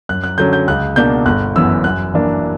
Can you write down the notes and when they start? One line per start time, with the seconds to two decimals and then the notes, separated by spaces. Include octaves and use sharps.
0.09 F#2 F#6
0.24 F#6
0.38 D3 F#3 C#4 G6
0.53 G6
0.68 C#2 F#6
0.96 B2 A#3 D4 G6
1.25 G1 F#6
1.56 F#2 E3 B3 E6
1.84 F#2 F#6
2.14 E3 A#3 D4